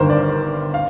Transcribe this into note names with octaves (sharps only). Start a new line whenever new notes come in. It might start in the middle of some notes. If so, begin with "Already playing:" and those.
Already playing: G1 G2 D#3 A#4 C5
D5
F5